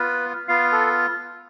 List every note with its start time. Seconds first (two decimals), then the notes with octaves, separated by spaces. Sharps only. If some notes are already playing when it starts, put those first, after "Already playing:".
Already playing: B3 F4 B4
0.48 B3 F4 F5
0.72 A4